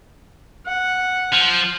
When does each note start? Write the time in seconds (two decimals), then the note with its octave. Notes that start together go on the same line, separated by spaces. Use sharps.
0.66 F#5
1.32 F3